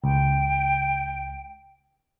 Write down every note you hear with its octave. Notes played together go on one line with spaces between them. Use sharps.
C#2 G5